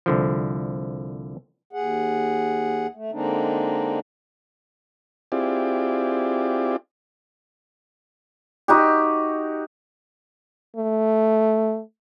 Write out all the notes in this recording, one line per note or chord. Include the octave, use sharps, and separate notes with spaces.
C2 D3 F3
D#2 G#4 F#5
A3
D3 G#3 A#3 C4 D4 D#4
C4 E4 F4 G4 G#4 D5
D#4 F#4 G4
A3